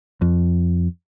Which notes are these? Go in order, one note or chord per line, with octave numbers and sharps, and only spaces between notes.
F2